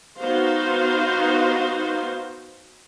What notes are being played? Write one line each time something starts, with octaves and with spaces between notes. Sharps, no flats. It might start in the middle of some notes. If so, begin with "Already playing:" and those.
B3 D#4 F#4 C5 F5 C6